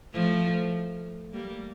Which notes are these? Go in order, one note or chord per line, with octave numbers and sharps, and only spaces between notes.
F3 A3
G3 A#3